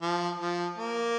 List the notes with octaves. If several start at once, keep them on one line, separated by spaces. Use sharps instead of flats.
F3
F3
A#3